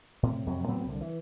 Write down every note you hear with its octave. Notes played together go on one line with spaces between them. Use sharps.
A2 C3
F2 C3 F#3
A2 F#3 B3 C4
C2 D3
E3